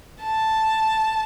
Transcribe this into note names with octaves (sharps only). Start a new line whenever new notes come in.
A5